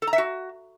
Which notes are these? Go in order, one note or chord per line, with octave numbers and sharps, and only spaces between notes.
A4
A#5
E5
F#4